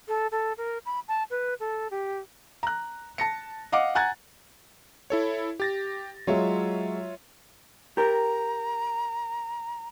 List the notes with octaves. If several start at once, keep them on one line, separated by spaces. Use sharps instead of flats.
A4
A4
A#4
B5
A5
B4
A4
G4
A#5 F#6
A5 A#6 C#7
D#5 F5 F#5 D6
F#5 G#5 A#5 F#6 G#6 A6
E4 A4 C#5
G4 A6 A#6
F#3 G#3 F4 C#5 E5
G4 A#4 A#5